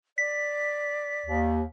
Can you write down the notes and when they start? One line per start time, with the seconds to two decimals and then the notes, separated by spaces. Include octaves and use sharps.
0.18 D5 B6
1.26 D#2